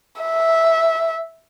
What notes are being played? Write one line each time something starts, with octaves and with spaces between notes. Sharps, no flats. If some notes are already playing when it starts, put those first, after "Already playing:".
E5